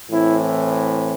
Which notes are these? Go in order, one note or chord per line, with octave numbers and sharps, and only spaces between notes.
A2 E3 C4 E4